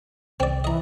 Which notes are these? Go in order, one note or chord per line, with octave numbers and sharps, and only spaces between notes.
C2 C4 D5
E3 D#5 A#5